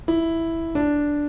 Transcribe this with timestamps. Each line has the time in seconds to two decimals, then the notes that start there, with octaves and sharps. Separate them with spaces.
0.08 E4
0.75 D4